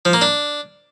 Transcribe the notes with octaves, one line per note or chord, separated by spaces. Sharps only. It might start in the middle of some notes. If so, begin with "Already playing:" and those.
F3
A#3
D4